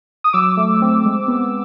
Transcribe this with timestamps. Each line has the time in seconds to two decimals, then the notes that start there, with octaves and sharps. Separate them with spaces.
0.24 D#6
0.33 F#3 D6 E6
0.57 A3
0.82 C4
1.05 G#3
1.28 B3